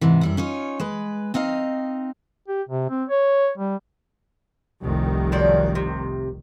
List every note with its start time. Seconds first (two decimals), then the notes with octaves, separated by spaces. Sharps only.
0.01 G#2 C3 E3
0.21 F#2 G3 E4
0.37 C#4 D#4 F4 C#5
0.80 G#3 B4
1.34 C4 D#4 D#5 F5
2.48 G4
2.69 C3
2.89 C4
3.09 C#5
3.58 G3
4.82 F1 C2 D#3
5.32 F3 F#3 D5
5.75 C3